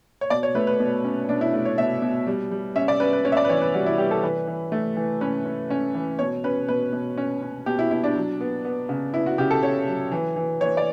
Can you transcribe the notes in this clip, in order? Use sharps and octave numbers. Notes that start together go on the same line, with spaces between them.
C#5
B2 D5
C#5
A3 B4
B4
B2
C#4
B2 D4
E4
A3
C#5
B2 E5
B2
G3
G3
C#4 E5
D5
C#4 B4
B4
C#4 C#5
E5
D5
B4
E3 C#5
B4
G3 F#4
E4
G3 G4
A4
E3 B4
E3
A3
E3
C#4 B4
C#4
C#4
E3
B2 C#5
C#4 B4
B2 B4
B2
C#4
C#4
B2 G4
E4
B2 E4
D4
F#3
B3
B3
C#3
B3 E4
F#4
C#3 G4
A4
C#3 C#5
F#3
E3
E3
E3 C#5
D5